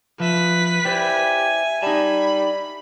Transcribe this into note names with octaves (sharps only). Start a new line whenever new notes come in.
F3 B4 E5 B6
E4 G4 C5 D5 E5 G#5
G3 D#4 A5 B5